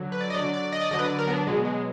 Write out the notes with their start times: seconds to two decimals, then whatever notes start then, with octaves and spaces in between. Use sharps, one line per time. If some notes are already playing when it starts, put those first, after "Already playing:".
Already playing: D3 F#3
0.12 B4
0.20 D5
0.30 D#5
0.34 D3 F#3 D5
0.54 D5
0.72 D#5
0.81 D5
0.91 D3 F#3 D#5
0.99 B4
1.05 D5
1.19 A#4
1.27 B3
1.32 D4
1.47 B2 F#3 G#3
1.65 G#3